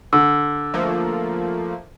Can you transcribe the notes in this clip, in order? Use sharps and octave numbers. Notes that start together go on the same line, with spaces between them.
D3 E6
F3 A3 A#3